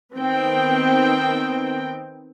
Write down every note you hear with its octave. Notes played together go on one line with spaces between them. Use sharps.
D#3 B3 C4 G5